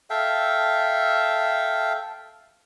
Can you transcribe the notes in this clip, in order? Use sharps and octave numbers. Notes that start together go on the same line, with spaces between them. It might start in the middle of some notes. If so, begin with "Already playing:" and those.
A4 E5 F5 G5